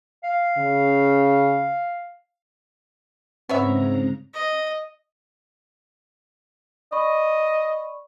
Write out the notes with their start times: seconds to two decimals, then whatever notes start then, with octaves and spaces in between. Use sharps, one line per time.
0.24 F5
0.58 C#3
3.49 G#2 C#3 B3 C4 C#5 E5 A#5
4.33 D#5
6.92 D5 D#5 B5 C#6